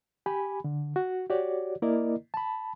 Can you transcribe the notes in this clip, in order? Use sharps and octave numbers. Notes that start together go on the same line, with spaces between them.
G4 G#5 B5
D3
F#4
F#4 G4 C#5 D5
A#3 E4 A#4 D5 D#5
A5 B5